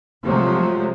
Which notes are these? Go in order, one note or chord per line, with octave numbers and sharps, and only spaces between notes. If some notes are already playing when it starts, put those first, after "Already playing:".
C3 F3 F#3 G#3 A3